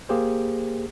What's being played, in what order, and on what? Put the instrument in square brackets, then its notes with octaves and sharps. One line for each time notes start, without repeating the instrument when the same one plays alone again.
[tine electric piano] A#3 G4 G#4 C5